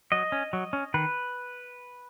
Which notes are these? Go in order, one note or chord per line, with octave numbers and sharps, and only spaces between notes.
F#3 D#5
C#4
F#3
C#4
D#3 B4